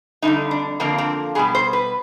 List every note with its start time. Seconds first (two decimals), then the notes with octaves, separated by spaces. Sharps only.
0.22 F2 D3 G3 D#4
0.51 D4
0.80 F2 D3 F3 A#3 C4
0.98 C4
1.35 B2 G3 B3 G#4
1.55 C5
1.73 B4